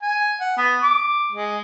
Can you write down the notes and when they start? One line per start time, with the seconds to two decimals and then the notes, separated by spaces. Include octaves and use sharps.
0.02 G#5
0.41 F#5
0.57 B3
0.84 D6
1.32 G#3